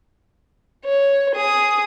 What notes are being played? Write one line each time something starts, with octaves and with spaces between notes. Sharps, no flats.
C#5
G#4 D#6